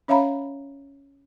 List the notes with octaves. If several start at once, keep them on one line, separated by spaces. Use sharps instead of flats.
C#4 C#5 E5 F5 A#5 B5